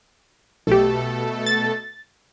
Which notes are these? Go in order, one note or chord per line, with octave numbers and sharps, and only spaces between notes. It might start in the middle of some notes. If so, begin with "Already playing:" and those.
B1 B2 A3 G4 A4
A6